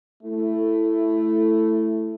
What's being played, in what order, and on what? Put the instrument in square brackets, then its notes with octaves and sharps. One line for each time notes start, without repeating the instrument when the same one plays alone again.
[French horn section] A3 E4